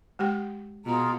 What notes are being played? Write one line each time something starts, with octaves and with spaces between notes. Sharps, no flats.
G#3 G4 G5
B2 F4 G#4 A#5